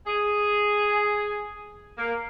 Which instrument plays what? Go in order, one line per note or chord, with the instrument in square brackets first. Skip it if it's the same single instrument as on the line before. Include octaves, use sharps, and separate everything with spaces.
[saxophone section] G#4
A#3